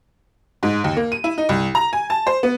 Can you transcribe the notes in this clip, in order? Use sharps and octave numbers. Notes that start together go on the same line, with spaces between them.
G#2
D#2
A#3
D#7
E4
D#4
C2
A#5
G#5
A5
C5
B3